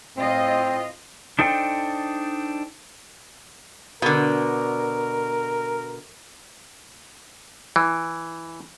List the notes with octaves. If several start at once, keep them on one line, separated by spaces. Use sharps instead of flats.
A2 C4 F4 D#5
D4 D#4 A4 C5 G5
B2 D3 A#4
E3